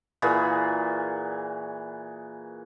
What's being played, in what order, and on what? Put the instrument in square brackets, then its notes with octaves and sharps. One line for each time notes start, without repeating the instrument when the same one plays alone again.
[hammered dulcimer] A#2 E3 F#4 G#4